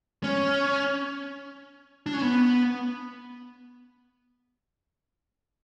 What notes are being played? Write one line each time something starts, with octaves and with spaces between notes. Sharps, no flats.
C#4
D4
C#4
B3